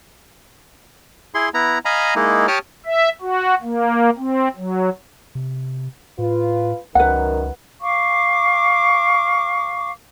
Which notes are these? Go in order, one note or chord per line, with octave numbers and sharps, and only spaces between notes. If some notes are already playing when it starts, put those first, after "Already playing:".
E4 G#4 C6
B3 E4 A#5
D#5 F5 G#5 A#5 B5
G#3 A#3 D#4 E4
G4 C#5 A5 D6 D#6 F6
E5
F#4
A#3
C4
F#3
C3
A2 F4 B4
C#2 F#2 D#3 A#4 B4 F#5
F5 C#6 D6